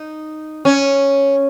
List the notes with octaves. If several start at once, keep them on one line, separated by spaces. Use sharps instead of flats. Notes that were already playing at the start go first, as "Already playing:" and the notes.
Already playing: D#4
C#4